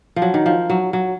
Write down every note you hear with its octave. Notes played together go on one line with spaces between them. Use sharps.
F3
F#3
D#3
F3
F#3
F#3